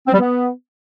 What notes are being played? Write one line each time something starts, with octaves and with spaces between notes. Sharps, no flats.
C4
G3
B3